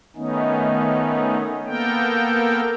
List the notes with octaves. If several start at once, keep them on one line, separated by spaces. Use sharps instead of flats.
D#3 A3 B3 C#4 D#4
A#3 B3 A4 A#4 G5